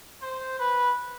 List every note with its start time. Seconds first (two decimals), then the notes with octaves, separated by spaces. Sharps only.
0.21 C5
0.58 B4